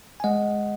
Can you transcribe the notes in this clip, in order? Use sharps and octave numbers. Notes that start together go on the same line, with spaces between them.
G#5
G#3 D#5 F#5